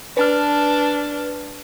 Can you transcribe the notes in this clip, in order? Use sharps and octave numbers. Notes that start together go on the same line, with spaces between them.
D4 B4 A5 F6